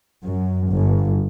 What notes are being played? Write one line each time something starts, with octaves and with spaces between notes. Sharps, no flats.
F#2
G1